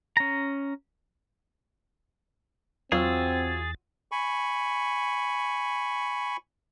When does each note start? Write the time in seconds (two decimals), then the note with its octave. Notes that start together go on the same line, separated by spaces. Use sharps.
0.17 C#4 A#5
2.92 E2 F#3 C4 F4 F#4 G#4 E6 A6
4.12 G#5 B5 C#6